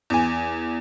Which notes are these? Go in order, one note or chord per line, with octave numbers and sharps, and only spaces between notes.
E2 G#5